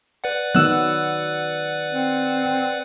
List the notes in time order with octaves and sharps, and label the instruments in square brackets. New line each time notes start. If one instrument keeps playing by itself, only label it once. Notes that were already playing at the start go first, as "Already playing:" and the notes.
[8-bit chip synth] B4 D5 F#5
[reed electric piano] D#3 E6 F#6 [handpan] F#3 B3
[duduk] C4